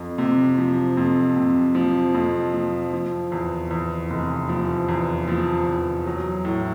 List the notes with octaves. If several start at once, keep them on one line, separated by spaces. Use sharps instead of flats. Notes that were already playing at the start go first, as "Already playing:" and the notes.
Already playing: F2
C3
F3
F2
C3
F3
F2
F3
F3
E2
E2
F1
F3
E2
F3
E2
F#3
A2